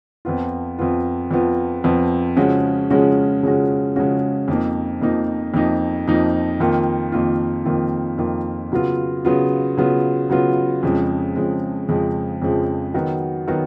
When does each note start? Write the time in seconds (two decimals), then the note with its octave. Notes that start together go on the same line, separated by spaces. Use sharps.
0.25 F2 F3 B3 F4
0.79 F2 F3 B3 F4
1.31 F2 F3 B3 F4
1.84 F2 F3 B3 F4
2.36 C#3 F3 G#3 C#4 F#4
2.90 C#3 F3 G#3 C#4 F#4
3.43 C#3 F3 G#3 C#4 F#4
3.96 C#3 F3 G#3 C#4 F#4
4.48 F2 F3 A#3 D#4
5.01 F2 F3 A#3 D#4
5.54 F2 F3 A#3 D#4
6.07 F2 F3 A#3 D#4
6.60 F2 D#3 A#3 F4
7.12 F2 D#3 A#3 F4
7.65 F2 D#3 A#3 F4
8.18 F2 D#3 A#3 F4
8.72 C#3 F#3 B3 F4
9.25 C#3 F#3 B3 F4
9.77 C#3 F#3 B3 F4
10.30 C#3 F#3 B3 F4
10.83 F2 C#3 F3 G#3
11.36 F2 C#3 F3 G#3
11.89 F2 C#3 F3 G#3
12.42 F2 C#3 F3 G#3
12.94 D#3 F#3 B3 F#4
13.48 D#3 F#3 B3 F#4